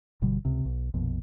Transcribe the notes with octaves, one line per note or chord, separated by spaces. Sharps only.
G1 B2 D3 G3
C#2 C3
B1
A#1 F2 B2